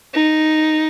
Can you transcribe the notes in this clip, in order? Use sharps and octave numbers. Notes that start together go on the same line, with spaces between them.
D#4